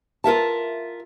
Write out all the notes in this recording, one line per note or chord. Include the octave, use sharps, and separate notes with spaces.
F4 A#4 E5 A5